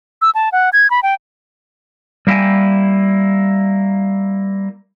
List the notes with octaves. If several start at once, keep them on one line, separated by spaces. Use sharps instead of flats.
E6
A5
F#5
G#6
B5
G5
G3 A#3 E4 F5 G5 G#5